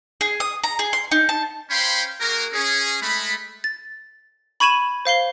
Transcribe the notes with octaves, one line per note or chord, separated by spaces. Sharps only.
G#4
D#6
A#5
G#4
C6
D#4
A5
C#4 C5 F5 G5 B5 C6
A#3 F#4 G#4 A#4
C#4 G#4
G#3 A3 B5
A6
B5 C#6 G#6 D#7 E7 F#7
C5 F5 C7 G7